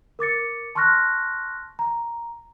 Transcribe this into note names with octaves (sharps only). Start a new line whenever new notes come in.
A#4 D6 A6 C#7
A5 C6 C#6 F6 F#6 A#6
A#5